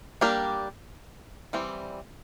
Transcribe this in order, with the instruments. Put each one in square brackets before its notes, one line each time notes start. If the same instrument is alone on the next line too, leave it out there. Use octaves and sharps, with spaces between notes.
[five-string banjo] G3 A#3 D4 G4 A#4
E3 G3 C4